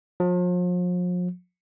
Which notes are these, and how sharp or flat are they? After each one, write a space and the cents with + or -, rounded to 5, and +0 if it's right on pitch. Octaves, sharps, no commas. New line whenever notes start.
F3 +40